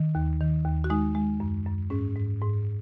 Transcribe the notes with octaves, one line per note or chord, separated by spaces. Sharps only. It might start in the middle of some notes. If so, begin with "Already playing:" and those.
Already playing: D#3
D#2
D#3
D#2
F#4
G#3 D#4
G#3
F#2
F#2
G#2 C#4
G#2
G#2